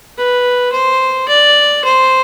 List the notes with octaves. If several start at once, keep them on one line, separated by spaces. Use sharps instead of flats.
B4
C5
D5
C5